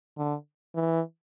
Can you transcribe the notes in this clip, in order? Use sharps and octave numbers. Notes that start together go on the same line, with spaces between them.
D3
E3